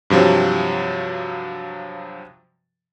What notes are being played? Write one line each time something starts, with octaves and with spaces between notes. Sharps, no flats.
G2 C3 F3 F#3